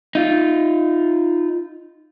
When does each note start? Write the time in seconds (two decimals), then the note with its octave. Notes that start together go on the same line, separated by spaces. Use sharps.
0.15 D#4 F4